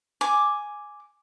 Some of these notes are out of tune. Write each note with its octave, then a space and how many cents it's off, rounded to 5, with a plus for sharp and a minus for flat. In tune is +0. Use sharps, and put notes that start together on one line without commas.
G#5 +0 D6 +0